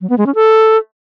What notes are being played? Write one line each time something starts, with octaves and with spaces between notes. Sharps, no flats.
F#3
B3
G#3
C#4
A4